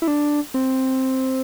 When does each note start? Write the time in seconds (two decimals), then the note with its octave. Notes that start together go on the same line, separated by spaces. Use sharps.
0.02 E4
0.07 D4
0.54 C4